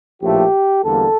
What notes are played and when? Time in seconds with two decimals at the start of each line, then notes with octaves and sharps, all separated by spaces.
0.22 A#1 A2 F3 A3 G4
0.85 E2 D3 G3 A#3 A4